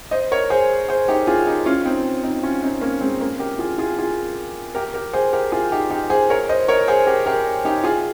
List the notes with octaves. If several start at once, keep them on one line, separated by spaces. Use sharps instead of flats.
C5 D#5
A#4 C#5
G#4 C5
G#4 C5
D#4 G4
F4 G#4
D#4 G4
C#4 F4
C4 D#4
C4 D#4
C#4 F4
C4 D#4
A#3 C#4
G#3 C4
A#3 C#4
G4 A#4
F4 G#4
F4 G#4
F4 G#4
G4 A#4
G4 A#4
G#4 C5
G4 A#4
F4 G#4
D#4 G4
D#4 G4
G#4 C5
A#4 C#5
C5 D#5
A#4 C#5
G#4 C5
G4 A#4
G4 A#4
D#4 G4
F4 G#4